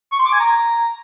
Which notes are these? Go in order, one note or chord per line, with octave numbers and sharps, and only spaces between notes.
C#6
C6
D6
G#5
A#5